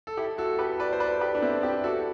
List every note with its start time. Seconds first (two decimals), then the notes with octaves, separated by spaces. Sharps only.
0.07 A4
0.17 E4 G4
0.38 F#4 A4
0.59 G4 B4
0.80 B4 D5
0.93 C5
1.00 B4 D5
1.21 G4 B4
1.35 D4
1.42 C4 E4
1.63 E4 G4
1.84 F#4 A4